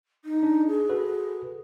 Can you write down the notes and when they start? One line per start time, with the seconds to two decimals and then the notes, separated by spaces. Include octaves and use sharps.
0.25 D#4
0.43 D4
0.68 G#4
0.89 F#4 A4 B4